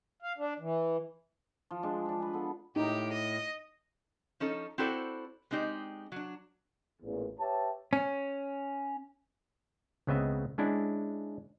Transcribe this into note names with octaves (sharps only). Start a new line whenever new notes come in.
F5
D4
E3
F3
G#3 D4
F3 D4
B4 G#5
B3 A4
A2 D#4 G4
D#5
F3 C#4 D#4 A4
C4 E4 F#4 A4 C5 D5
G#3 C4 D#4 G4 D5
F#3 D4
A1 E2 A#2
G4 B4 C#5 E5 A5
C#4
C#2 C#3 B3 C4 D#5 E5
G#3 C#4 D4 E4